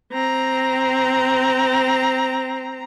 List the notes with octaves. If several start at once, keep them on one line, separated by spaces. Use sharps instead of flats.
C4 A#5